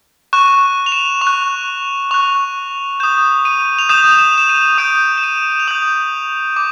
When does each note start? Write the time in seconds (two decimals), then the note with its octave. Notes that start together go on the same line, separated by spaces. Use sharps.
0.33 C#6 F#6 E7
0.86 F7
0.92 E7
1.21 C#6 F7
1.27 F#6
2.11 C#6 F#6 F7
3.00 D#6 G6 E7
3.45 D#7
3.79 F7
3.89 D#6 G6 E7
4.11 F7
4.19 E7
4.38 E7
4.49 D#7
4.78 D#6 G6 D7
5.18 E7
5.23 D#7
5.52 E7
5.60 F7
5.68 D#6 G6 F#7
6.56 D6